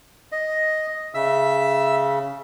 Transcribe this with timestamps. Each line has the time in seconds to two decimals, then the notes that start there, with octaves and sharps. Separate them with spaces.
0.32 D#5
1.14 C#3 E5 E6